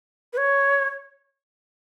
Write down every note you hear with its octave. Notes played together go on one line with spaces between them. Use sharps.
B4
C#5